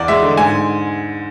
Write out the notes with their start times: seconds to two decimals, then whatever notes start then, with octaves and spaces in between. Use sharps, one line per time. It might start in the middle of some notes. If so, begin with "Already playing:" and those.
Already playing: E2 D5
0.08 G#3 E5
0.22 D3
0.37 G#2 G#5